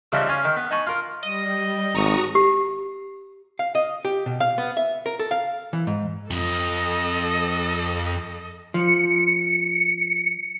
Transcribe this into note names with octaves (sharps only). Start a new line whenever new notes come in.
C#3 E3 F3 G3 D#4
C#4 F5 G#5
D#3
B3
D#4 G#5 A5 B5 C#6
F4 A#4
G3 D#5
G#1 F#4 A#5 C#6 D#6
G4
F5
D#5
G4
B2
F5
B3
E5
A#4
A4
F5
E3
G#2
F2 F3 A4 D#5
F3 C#7